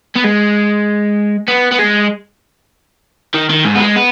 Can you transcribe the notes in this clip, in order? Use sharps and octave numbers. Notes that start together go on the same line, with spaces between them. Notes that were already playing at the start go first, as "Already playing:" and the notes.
B3
G#3
B3
B3
G#3
D#3
D#3
G#2
B3
G#3
B3